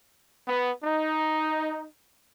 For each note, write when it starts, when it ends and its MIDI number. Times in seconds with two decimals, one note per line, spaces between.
0.48 0.72 59
0.84 1.87 63